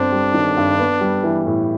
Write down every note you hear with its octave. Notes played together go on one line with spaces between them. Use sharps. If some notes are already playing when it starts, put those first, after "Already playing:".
Already playing: G1 C4 D4
G3
D#3
G2
B3
G3
E3
A2